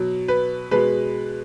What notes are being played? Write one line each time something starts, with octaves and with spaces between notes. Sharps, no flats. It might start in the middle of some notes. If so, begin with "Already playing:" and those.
Already playing: B2 F#3
B4
B2 G#3 B4